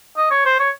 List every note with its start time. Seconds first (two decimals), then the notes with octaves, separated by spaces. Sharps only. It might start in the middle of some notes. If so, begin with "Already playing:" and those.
0.17 D#5
0.31 C#5
0.46 C5
0.59 C#5